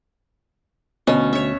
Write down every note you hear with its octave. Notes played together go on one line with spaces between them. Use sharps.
D2 B2 C#4
C#5 E5